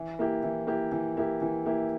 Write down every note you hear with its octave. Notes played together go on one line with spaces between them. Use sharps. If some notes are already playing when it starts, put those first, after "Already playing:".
Already playing: E3
A#3 E4 G4
E3
A#3 E4 G4
E3
A#3 E4 G4
E3
A#3 E4 G4